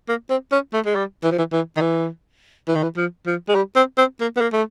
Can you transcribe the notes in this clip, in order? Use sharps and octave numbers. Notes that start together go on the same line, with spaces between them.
A#3
C4
C#4
A3
G#3
G3
E3
F3
E3
E3
D#3
E3
E3
D#3
E3
F3
F3
G#3
G3
C4
C4
A#3
B3
A#3
A3